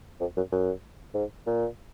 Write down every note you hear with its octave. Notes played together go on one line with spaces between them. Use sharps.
F2
F#2
F#2
G#2
A#2